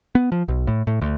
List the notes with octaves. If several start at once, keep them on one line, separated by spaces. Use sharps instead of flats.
B3
F3
B1
A2
A2
D2